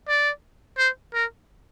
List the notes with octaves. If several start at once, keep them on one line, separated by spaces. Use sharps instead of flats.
D5
C5
A#4